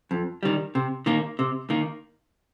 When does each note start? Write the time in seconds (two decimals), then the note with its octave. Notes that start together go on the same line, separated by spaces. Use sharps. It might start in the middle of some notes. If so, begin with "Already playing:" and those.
0.11 F2
0.43 D#3 G3
0.75 C3
1.06 D#3 A#3
1.39 C3
1.70 D#3 A#3